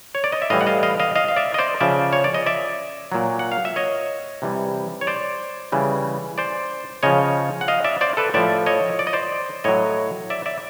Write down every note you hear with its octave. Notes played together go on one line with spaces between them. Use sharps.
C#5
D5
D#5
E5
A2 E3 G3 D#5 F5
F#5
D#5 F5
D#5 F5
D#5 F5
D#5 F5
F5
D5 E5
D#5
C5 D5
C#3 F3 D5 E5
C#5
D5
D#5
D5 E5
A#2 F#3
F#5
F5
E5
C#5 D#5
C3 E3 G3
C#5
C5 D5
C#3 E3 G3
C5 D5
C#3 F3 C#5 D#5
F#5
D#5 F5
D5 E5
C5 D5
A4 B4
A2 F3 D5 E5
C#5 D#5
D5
D#5
C5 D5
A2 F#3 C#5 D#5
D5 E5
D5 E5